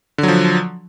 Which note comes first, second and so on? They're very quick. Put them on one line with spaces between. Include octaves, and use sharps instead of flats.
D3 F#3 F3